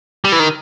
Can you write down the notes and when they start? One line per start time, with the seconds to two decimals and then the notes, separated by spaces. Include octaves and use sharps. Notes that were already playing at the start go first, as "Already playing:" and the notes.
0.25 G3
0.32 E3
0.40 D#3